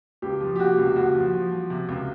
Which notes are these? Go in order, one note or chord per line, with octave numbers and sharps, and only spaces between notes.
C#2 G4
F3
G4
C3 F#4
C#2
C#2 F#4
F3
F3
F3
C3
C#2